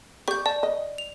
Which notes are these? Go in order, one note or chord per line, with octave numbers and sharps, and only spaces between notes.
G4 D5 C#6 G6
D5 A5
D#5
F7